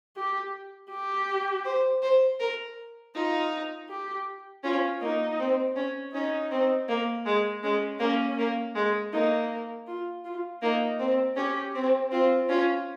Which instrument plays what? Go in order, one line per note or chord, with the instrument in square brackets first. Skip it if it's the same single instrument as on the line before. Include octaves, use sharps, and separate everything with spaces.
[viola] G4
G4
[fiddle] C5
C5
A#4
[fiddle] D#4 [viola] F4
[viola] G4
[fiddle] C#4 [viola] F4
[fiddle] A#3 [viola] D#4
[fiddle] C4
C#4
[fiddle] C#4 [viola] D#4
[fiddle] C4
A#3
G#3
[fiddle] G#3 [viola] C#4
[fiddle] A#3 [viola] C#4
[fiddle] A#3
G#3
[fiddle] A#3 [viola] D#4
[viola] F4
F4
[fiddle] A#3 [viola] D#4
[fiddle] C4
[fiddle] C#4 [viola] G4
[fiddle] C4
[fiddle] C4 [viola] F4
[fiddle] C#4 [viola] F4